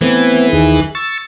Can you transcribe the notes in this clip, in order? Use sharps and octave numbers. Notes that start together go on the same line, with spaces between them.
E3 A3 B3 C4
D#2 D#3 G#4
C#6 E6 A6